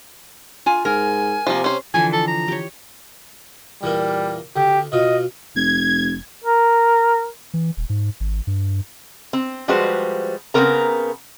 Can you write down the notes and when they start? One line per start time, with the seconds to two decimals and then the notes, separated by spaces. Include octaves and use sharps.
0.66 F4 G#5
0.85 G#2 A#4 G#5
1.47 C3 F3 A#3
1.64 C#4 C5
1.94 D3 E3 F3 G#5
2.13 A4
2.27 A#5
2.48 G4 C#5
3.83 E2 A#2 G3 A#3
4.56 D2 G4
4.92 B2 F4 D#5
5.56 F1 G#6
6.45 A#4
7.54 E3
7.77 D#1
7.90 G#2
8.20 G#1
8.47 G2
9.33 C4
9.68 F3 G3 G#3 F#4 B4 C5
10.54 C#3 G#3 B3 C4 A#4 A#5